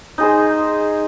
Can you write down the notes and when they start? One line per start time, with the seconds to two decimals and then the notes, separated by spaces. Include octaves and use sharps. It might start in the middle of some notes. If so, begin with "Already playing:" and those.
0.18 D#4 G#4 C5